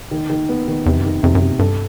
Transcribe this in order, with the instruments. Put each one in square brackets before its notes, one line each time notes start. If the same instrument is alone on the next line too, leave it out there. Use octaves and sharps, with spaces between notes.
[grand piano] D#3
D#3
B3
D#3
[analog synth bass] E2 [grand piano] C3
[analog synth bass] F#2
[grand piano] D#3
[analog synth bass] F2
[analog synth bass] F2 [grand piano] C3
[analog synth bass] F#2
[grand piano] C3
[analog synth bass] G2 [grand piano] A4